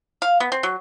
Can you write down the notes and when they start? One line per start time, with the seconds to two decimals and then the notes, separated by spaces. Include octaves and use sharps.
0.22 F5
0.40 B3
0.52 C4
0.63 F#3